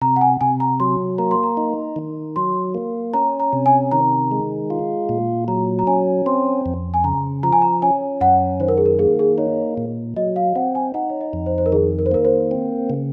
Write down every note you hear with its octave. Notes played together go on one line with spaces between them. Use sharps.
C3 A#5
F#5
G#5
C3 G#5
A#5
F#3 C6
A#3 A#5
C6
A#5
D#4
D#3
F#3 C6
A#3
C#4 A#5
A#5
C3
G#5
D#3 A#5
G#3
F4
A#2
F#3 A#5
A#5
C#4 G#5
C4 C6
F2
G#5
C#3 A#5
F3 A#5
G#5
A#5
C#4 G#5
F#2 F#5
D#3 C5
A#4
G#4
A#4
A#3 G#4
G#4
D#4 C#5
A#2
F#3 D#5
F5
C4 F#5
G#5
D#4 F#5
C#5
D#5
F2
C5
C5
A#4
D#3 G#4
A#4
C5
A#3 A#4
C5
C4
C#3